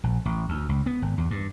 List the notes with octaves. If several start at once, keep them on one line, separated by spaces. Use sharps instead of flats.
A#1
A1
D2
C#2
B3
G#1
E2
G2